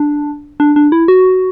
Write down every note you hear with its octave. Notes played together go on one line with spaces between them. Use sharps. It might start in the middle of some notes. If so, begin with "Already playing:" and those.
Already playing: D4
D4
D4
E4
F#4